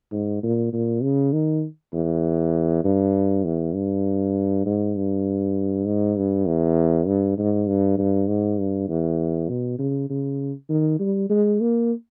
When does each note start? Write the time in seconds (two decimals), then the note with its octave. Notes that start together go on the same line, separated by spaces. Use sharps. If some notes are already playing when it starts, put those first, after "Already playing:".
0.12 G#2
0.43 A#2
0.73 A#2
1.03 C#3
1.33 D#3
1.93 E2
2.84 G2
3.45 E2
3.74 G2
4.66 G#2
4.96 G2
5.86 G#2
6.17 G2
6.47 E2
7.07 G2
7.38 G#2
7.67 G2
7.98 G2
8.28 G#2
8.59 G2
8.89 E2
9.49 B2
9.79 C#3
10.10 C#3
10.69 D#3
11.00 G3
11.30 G#3
11.61 A#3